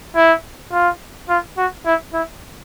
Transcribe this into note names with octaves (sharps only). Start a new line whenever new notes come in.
E4
F4
F4
F#4
E4
E4